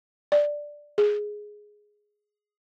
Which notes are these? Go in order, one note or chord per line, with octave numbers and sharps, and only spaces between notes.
D5
G#4